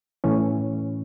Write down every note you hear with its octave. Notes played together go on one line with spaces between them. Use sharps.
A2 E3 C#4